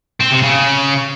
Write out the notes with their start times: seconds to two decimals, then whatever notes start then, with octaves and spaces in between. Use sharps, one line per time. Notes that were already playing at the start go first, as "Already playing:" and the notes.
0.20 C4
0.31 C3
0.43 C#3